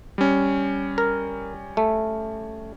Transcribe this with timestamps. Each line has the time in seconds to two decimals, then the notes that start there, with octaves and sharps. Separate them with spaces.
0.18 G3 C#4
0.98 A#4
1.77 A3